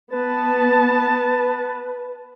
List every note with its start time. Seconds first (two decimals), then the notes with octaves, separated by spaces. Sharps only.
0.12 B3 B4 A5